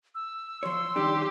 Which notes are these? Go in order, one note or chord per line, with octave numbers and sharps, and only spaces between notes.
E6
F3 C#5 C6
D#3 G3 D4 G4